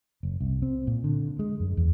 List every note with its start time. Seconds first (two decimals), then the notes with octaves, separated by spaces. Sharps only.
0.23 F#1
0.41 C2
0.62 C4
0.87 A#2
1.04 D3
1.39 G#3
1.60 F#2
1.77 E2